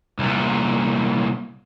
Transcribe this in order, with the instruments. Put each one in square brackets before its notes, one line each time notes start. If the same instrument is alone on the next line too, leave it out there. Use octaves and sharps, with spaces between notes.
[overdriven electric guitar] C2 A#2